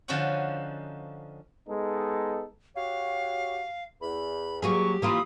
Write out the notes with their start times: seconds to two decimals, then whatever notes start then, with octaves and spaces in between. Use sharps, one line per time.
0.08 D3 F3 C#4 D#4 F#4 F#5
1.69 G#3 B3 D#4 A4
2.76 F#4 G4 C#5 F5
4.01 E2 B5
4.62 F#3 A#3 G4 G#4 C#6
5.02 E3 A#3 F4 F5 B5 D#6